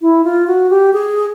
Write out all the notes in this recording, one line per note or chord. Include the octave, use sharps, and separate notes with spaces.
E4
F4
F#4
G4
G#4